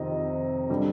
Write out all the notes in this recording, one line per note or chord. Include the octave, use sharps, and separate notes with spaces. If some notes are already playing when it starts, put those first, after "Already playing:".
Already playing: F2 C3 D#3 C4 D#5
D3 G3